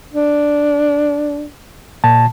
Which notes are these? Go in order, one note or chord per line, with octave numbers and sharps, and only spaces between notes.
D4
A#2 A5